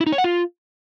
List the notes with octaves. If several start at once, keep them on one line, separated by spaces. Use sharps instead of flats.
E4
D#4
C#5
F#5
F4